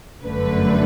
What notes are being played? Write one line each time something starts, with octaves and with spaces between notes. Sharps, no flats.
G1 F#2 D3 A3 B4